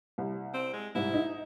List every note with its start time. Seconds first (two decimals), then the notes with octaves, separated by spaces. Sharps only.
0.18 C2
0.54 C4
0.73 G#3
0.95 C2 G#2 E4
1.14 D#4